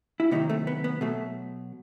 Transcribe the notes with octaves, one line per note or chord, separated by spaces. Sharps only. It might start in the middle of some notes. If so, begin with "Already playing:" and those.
E4
C3 D#3 F#3 B3 D#4
A3
B3
B3
B2 F#3 A3